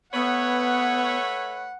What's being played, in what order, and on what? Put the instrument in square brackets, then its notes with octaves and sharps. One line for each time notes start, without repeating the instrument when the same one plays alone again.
[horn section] A3 B4 C#5 [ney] B3 [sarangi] F#5